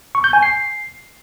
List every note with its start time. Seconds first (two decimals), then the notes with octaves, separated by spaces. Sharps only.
0.15 C#6
0.24 G6
0.33 G#5
0.43 C7